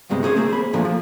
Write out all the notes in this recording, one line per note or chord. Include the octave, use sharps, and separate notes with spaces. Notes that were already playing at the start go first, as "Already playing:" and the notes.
D2 G2 C3 G#3 B3
C#4 G#4 C5 C#5
A3 A#3 C4 G#4
C5 B5
A#2 D3 F3 A3 A#3
F3